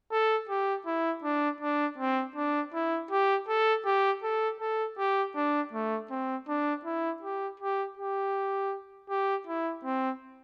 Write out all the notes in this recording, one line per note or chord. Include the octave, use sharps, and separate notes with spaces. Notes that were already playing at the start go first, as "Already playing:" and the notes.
A4
G4
E4
D4
D4
C4
D4
E4
G4
A4
G4
A4
A4
G4
D4
A3
C4
D4
E4
G4
G4
G4
G4
E4
C4